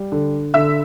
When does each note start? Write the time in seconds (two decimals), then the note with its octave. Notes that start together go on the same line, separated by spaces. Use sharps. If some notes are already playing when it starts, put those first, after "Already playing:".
Already playing: G3
0.12 D3
0.54 D3 E5 E6